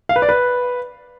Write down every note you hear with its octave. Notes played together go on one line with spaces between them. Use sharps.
F5
B4
D5
B4